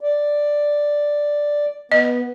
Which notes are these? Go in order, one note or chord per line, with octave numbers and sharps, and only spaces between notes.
D5
B3 D#5